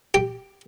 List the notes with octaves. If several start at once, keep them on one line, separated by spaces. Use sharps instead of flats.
G4